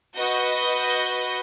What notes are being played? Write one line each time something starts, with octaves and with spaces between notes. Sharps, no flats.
F#4 B4 D#5 G6 A#6